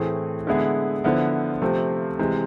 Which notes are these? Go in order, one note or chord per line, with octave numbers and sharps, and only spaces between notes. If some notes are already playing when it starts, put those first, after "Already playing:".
Already playing: A2 E3 A3 C4 G#4
D3 G#3 B3 E4 G#4
D3 F3 B3 E4
C3 F3 A3 C4
C3 E3 G#3